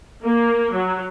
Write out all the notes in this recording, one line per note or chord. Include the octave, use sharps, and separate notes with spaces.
A#3
F#3